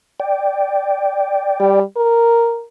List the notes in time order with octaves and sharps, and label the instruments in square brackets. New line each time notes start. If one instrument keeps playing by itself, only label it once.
[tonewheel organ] D5 G5
[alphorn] G3
A#4